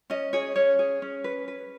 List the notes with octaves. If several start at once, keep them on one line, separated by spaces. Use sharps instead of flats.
C#4 D#5
G#4 C#5
C#4 C#5
G#4
C#4
B4
B4